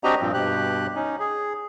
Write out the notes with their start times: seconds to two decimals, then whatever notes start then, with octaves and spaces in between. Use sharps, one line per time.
0.04 C4 D4 F#4 G4 D#5 A#5
0.21 G2 A#2 F3 C4
0.34 G2 B2 G4 F#6
0.95 C#4 D#4
1.20 G#4